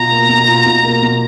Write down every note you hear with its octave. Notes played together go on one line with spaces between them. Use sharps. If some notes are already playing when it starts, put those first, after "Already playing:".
Already playing: B2 F4 A#5
A#3
B2
F4
B2
A#3
B2